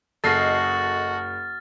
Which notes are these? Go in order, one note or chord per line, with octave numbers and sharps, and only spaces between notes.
F#1 F#4 A4 D#5 F6 A6 C7